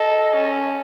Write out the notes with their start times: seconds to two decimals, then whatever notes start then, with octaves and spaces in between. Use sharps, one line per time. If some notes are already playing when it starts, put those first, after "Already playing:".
Already playing: A4 D#5
0.34 C#4